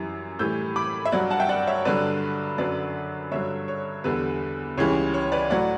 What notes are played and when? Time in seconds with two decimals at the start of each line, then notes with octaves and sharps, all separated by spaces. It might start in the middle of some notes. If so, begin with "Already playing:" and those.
Already playing: F#2 E3 G3
0.39 A2 E3 G3 E6 G6
0.76 B5 D6
1.05 E5
1.12 G2 F#3 D5 F#5
1.31 F#5 A5
1.40 E5 G5
1.49 D5 F#5
1.67 C#5 E5
1.85 G2 D3 F#3 B4 D5
2.58 F#2 D3 F#3 B4 D5
3.32 G2 D3 F#3 C#5 E5
3.68 C#5
4.04 E2 D3 G3 B4
4.78 C#2 C#3 E3 G3 C#5
5.14 C#5
5.32 B4 D5
5.50 A2 F#3 D5 F#5